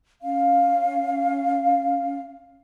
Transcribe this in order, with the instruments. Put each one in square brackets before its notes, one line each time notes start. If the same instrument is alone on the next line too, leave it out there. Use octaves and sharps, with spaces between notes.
[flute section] C#4 F5